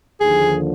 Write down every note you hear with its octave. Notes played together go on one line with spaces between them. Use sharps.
D#2 D3 F3 G#4